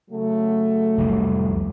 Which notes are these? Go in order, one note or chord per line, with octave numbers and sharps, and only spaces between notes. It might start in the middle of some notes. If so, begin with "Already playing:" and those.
C#3 F#3 A3
C2 F2 G3